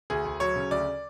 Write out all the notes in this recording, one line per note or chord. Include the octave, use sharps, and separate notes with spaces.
D2 G#4
D2
F#3 C#5
C#3
D2 D5